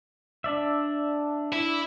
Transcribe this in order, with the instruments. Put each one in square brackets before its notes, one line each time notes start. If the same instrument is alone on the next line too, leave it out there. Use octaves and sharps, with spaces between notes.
[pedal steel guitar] D4 D5 E5
[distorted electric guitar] E4